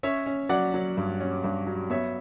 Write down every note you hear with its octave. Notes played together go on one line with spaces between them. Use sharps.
C#4 C#5 E5
C#4
F#3 D5 F#5
F#3
G2
C#4
G2
F#3
B3 C#5 E5